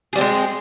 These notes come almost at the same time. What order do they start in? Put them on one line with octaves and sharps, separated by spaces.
G#4 G3 C4 G#3